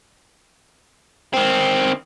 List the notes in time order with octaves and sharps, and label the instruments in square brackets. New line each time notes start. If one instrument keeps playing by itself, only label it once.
[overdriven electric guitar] D#3 C4